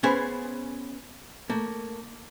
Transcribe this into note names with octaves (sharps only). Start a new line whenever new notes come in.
B3 C#4 G#4 B4 C5 G#5
A3 A#3